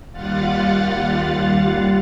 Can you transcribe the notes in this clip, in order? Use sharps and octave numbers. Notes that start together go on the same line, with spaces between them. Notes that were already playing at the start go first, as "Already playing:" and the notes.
D#2 G3 F4 F5 F#5 A6